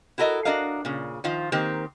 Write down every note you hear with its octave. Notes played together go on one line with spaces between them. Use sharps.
E4 F#4 A4 A#4 D#5
D4 F#4 A#4 D#5 F5
A#2 C#3
D#3 F3 F4
D#3 A#3 C4 G4